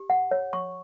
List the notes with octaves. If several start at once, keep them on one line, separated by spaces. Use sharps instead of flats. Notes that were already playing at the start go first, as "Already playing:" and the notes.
Already playing: G4
F#5
C#5
C#6